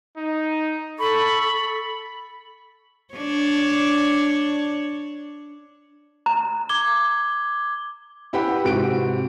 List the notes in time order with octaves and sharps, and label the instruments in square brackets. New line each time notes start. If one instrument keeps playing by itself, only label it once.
[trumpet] D#4
[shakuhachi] A4 [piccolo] B5 [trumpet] C#6
[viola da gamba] D4 C#5
[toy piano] A#5
[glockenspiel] D6 G#6 G7
[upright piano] E4 G4 B4 F#5 G5 B5
G#2 C3 F#4 D7